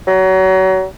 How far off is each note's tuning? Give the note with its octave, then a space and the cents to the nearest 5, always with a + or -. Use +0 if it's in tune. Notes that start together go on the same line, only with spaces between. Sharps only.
F#3 +30